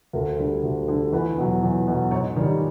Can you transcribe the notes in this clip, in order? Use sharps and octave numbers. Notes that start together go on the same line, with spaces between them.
D2 A#4
D3 G3
D2
D3 G3
E2 B4
B2 F#3
E2
B2 F#3
G#2 C#5
D#3 G3